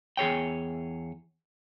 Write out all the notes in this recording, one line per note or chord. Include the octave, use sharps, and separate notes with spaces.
E2 G#4 C#5 G5